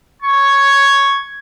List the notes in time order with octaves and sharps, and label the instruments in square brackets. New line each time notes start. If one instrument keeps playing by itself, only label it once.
[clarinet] C#6 [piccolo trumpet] G#6